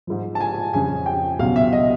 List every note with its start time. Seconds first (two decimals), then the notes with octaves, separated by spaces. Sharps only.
0.07 G#2 F3
0.35 A5
0.41 G#5
0.73 F2 C#3 F3 G#5
1.06 G5
1.39 C#2 B2 F#3 F5
1.56 E5
1.73 D#5